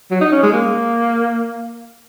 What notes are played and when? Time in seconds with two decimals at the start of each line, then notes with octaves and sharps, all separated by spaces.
0.11 F#3
0.21 D#4
0.32 C#4
0.43 G#3
0.53 A#3